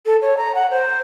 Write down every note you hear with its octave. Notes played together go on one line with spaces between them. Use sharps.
A4
C#5
A#5
F#5
C5